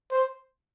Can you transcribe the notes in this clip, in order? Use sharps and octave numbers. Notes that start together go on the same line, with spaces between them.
C5